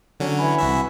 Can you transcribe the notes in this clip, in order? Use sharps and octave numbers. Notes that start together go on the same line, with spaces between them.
D3 F#3 C#4
E3 G#5 B5
C2 F#4 E5